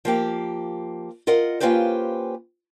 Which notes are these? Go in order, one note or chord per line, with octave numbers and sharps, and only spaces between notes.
F3 A#3 G4
F4 A#4 D#5 F#5
A#3 C#4 F4 G4 B4 C5